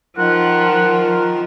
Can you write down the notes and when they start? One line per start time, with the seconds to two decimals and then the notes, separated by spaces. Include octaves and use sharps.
0.18 D#3 F3 F4 A#4 F#5